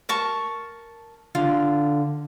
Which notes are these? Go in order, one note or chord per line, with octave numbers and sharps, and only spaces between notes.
A#4 A5 C#6
D3 F4